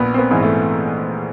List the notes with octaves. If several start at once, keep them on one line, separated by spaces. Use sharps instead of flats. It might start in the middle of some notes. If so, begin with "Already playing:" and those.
Already playing: A#1 B3
C4
B3
G#2 E3
A3